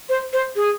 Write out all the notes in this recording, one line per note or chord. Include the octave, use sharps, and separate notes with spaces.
C5
C5
G#4